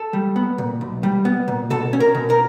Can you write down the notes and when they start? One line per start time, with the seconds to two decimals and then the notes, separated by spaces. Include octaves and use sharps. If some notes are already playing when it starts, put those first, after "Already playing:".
Already playing: A4
0.13 G3
0.36 B3
0.58 A#2
0.81 B1
1.03 G3
1.25 B3
1.48 A#2
1.70 B2 A4
1.93 C#4
2.00 A#4
2.15 B2
2.30 A#4